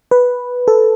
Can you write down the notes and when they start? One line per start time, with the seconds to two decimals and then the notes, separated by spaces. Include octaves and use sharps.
0.11 B4
0.68 A4